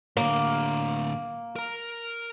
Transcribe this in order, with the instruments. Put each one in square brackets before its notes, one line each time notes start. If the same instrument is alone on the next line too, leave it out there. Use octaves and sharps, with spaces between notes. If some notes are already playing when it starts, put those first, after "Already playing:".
[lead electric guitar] A2 D3 [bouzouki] A#3
[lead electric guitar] A#4 A#5